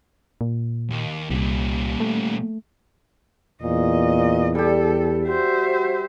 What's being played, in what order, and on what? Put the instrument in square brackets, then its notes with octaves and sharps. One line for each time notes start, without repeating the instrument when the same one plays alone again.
[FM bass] A#2
[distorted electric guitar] D#2
[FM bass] C2 [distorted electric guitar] A#2 G3
[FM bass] A3
[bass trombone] E2 [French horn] A#2 [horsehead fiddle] D#5
[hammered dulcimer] G3 G4 [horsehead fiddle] A4
[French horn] F#4 [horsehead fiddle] C5 E5